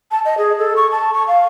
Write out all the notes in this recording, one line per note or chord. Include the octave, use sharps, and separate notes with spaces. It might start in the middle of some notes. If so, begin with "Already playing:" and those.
A5
D#5
G#4
A4
C#6
A5
C#6
F5